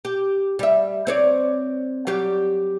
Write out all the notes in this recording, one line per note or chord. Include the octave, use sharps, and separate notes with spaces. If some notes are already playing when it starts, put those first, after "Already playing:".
G4
G3 E5
C4 C#5 D5
F#3 G3 G4